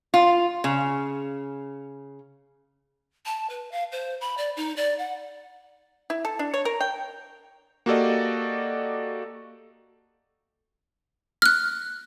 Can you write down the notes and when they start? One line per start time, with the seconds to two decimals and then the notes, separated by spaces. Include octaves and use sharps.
0.14 F4
0.64 C#3
3.26 A5
3.49 B4
3.72 F5
3.92 C5
4.21 B5
4.38 D5
4.56 D#4
4.76 D5
4.99 F#5
6.10 E4
6.25 A4
6.39 D4
6.54 C#5
6.65 A#4
6.81 G5
7.86 A#3 F#4 G4 A4 D5 D#5
11.42 F6 F#6